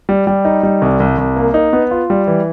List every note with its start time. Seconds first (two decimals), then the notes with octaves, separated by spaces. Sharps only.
0.09 G3
0.27 G3
0.45 D#4
0.63 G3
0.82 C2
1.00 C2
1.18 C2
1.36 A#3
1.54 D#4
1.73 B3
1.91 F4
2.10 G3
2.27 E3